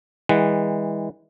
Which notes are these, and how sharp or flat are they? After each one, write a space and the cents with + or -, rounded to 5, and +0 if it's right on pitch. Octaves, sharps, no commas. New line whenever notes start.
E3 -30 G#3 -30 F#5 +0